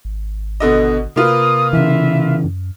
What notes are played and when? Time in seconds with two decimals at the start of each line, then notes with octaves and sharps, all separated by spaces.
0.05 G#1
0.60 B2 D3 D#5
1.16 C3 A#3 F4 B4 D#6
1.73 C#3 E3 E5
2.44 F#2